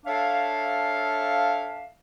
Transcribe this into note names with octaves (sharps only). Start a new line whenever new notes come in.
D4 A4 C#5 E5 F5